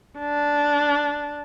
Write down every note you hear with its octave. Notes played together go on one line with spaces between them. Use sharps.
D4